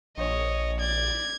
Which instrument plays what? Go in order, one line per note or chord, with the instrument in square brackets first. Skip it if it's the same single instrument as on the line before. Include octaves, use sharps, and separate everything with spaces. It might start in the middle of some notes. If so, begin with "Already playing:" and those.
[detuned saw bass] A#1 [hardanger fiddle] C#5 [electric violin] D#5
[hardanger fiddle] D5 [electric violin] G#6